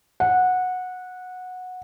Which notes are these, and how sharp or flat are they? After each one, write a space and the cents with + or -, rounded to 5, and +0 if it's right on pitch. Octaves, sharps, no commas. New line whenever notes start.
F#5 -15